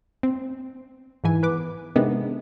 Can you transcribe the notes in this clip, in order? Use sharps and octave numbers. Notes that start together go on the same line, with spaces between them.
C4
G#2 E3 G#5
B3 B4 D6
C3 D#3 G#3 B3 D4 D#4